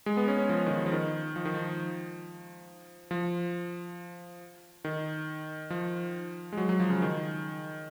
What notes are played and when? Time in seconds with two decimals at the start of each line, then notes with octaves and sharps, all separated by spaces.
0.06 G#3
0.17 B3
0.28 C#4
0.38 C#4
0.49 F3
0.66 D#3
0.71 F3
0.86 F3
0.92 D#3
1.36 F3
1.45 D#3
1.54 F3
3.11 F3
4.85 D#3
5.70 F3
6.53 G#3
6.57 F#3
6.69 F#3
6.80 F3
6.90 C#3
7.02 D#3